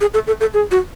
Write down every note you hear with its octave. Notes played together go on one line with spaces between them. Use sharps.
G#4
A4
A4
A4
G#4
F#4